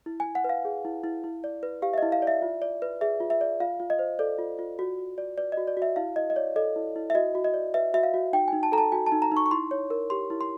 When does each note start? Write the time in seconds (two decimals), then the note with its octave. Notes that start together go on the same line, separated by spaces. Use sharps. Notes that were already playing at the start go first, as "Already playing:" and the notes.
0.06 E4
0.20 G#5
0.26 E4
0.35 F#5
0.44 B4
0.49 F5
0.65 G#4
0.85 E4
1.04 E4
1.24 E4
1.44 D5
1.63 B4
1.82 G4 F5
1.94 E5
1.98 E4 D#5
2.12 F5
2.22 D5
2.27 E5
2.42 F4
2.62 D5
2.82 B4
3.01 G#4 E5
3.20 F4
3.30 E5
3.41 D5
3.60 F4 F5
3.80 F4
3.90 D#5
3.99 C5
4.19 A4 D5
4.39 F4
4.59 F4
4.79 F#4
4.98 F#4
5.18 D5
5.38 B4 D5
5.52 D#5
5.57 F#4
5.67 D5
5.77 F#4
5.82 E5
5.96 E4 F5
6.16 E4 D#5
6.30 D#5
6.36 C#5 D5
6.56 A4 D#5
6.76 E4
6.96 E4
7.10 E5
7.15 F#4 D#5
7.35 F#4
7.44 D#5
7.54 D5
7.74 B4 E5
7.94 F#4 E5
8.03 F5
8.14 F#4
8.33 D#4 G5
8.48 D#4 G#5
8.63 A5
8.72 A4 A#5
8.78 A5
8.92 F#4 G#5
9.06 A5
9.12 D#4
9.22 A#5
9.32 D#4 C#6
9.46 C#6
9.51 E4 C6
9.71 C#5
9.90 A#4
10.10 G4 C6
10.30 E4
10.41 C6